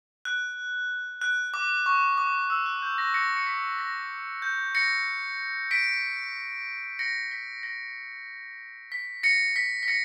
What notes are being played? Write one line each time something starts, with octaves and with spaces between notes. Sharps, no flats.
F#6
F#6
D6
C#6
D6
E6
F#6
G6
A#6
A#6 C#7
C#7
B6
A#6
G6
A#6 C#7
B6 D7
A#6 C#7
B6
A#6
B6
A#6 C#7
B6
B6
A#6 C#7